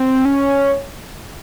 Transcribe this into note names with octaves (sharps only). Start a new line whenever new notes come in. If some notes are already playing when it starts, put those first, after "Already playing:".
Already playing: C4
C#4